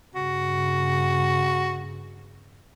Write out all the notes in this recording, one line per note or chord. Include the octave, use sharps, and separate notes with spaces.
G2 C#3 F#4